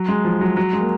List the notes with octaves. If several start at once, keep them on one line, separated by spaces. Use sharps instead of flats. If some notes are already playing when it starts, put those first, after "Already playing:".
Already playing: F#3
G#3
F3
F#3
F#3
G#3
A#3